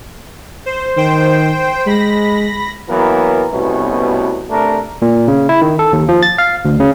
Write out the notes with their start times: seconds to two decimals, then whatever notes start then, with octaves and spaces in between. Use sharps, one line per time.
0.66 C5
0.97 D#3 C5 G5
1.87 G#3 B5 A#6
2.89 E3 F#3 A#3 B3 A#4
3.52 C2 B2 A3 B3 C#4 F#4
4.50 C3 A3 D4 A#4
5.02 A#2
5.28 C#3
5.49 E4
5.62 D#3
5.79 A4
5.93 D#2
6.09 F3
6.23 A6
6.38 F5
6.65 D2
6.80 C#3